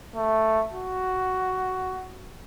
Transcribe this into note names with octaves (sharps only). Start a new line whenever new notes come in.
A3
F#4